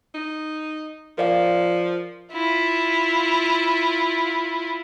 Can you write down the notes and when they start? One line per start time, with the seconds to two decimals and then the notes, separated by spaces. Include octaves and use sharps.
0.15 D#4
1.18 F3 A#4 D5 F5
2.32 E4 F4